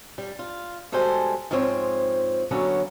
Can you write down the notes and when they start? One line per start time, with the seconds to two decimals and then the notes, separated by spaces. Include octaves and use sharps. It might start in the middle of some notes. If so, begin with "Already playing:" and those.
0.18 G3
0.39 F4
0.92 B2 G3 G#3 A4 C5 G#5
1.51 G#2 F3 G#3 C4 C#5
2.51 D3 F#3 A#3 B3 C#4